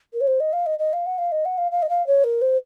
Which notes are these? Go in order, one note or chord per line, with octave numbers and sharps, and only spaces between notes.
A#4
C#5
C5
D#5
F5
D#5
D#5
F5
F#5
F5
D#5
F#5
F5
F5
D#5
F5
C#5
A#4
C5